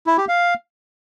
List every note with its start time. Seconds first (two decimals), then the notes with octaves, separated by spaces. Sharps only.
0.07 E4
0.18 G4
0.28 F5